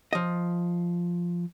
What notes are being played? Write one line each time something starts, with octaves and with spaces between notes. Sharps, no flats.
F3 D#5